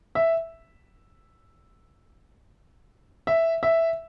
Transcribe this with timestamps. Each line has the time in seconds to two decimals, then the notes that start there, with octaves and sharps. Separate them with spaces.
0.15 E5
3.27 E5
3.63 E5